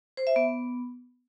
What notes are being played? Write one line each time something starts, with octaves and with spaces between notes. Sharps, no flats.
C5
E5
B3